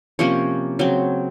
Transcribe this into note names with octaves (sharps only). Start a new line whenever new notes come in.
C3 F3 A#3 C#4 C#5
C#3 F#3 C4